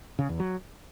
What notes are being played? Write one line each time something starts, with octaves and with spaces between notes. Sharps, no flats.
C#3
E2
F#3